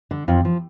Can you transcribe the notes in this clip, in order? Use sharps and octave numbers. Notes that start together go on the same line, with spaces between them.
D3
F2 F3
F3